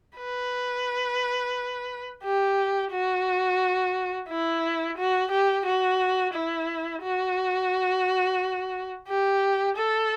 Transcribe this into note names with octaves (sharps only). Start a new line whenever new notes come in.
B4
G4
F#4
E4
F#4
G4
F#4
E4
F#4
G4
A4